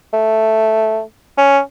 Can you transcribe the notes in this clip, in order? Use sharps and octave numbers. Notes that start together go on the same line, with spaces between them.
A3
C#4